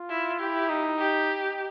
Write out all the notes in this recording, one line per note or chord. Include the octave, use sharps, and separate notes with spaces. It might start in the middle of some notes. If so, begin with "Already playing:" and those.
Already playing: F4
E4
E4 G4
D#4
G4